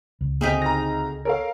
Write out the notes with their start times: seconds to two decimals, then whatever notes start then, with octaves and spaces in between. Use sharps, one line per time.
0.21 C#2
0.41 D2 C4 D#4 G4 G#4
0.62 A#5 A#6
1.25 A4 A#4 C#5 F5